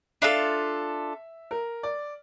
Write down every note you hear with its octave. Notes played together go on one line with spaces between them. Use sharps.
D4 F4 A4 E5
A#4
D5